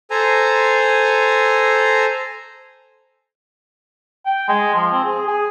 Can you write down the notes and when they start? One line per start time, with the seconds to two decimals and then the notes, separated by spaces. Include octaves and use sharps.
0.11 A4 C5 G#5 A#5
4.26 G5
4.49 G#3
4.75 F3
4.92 C4
5.04 G#4
5.27 G#4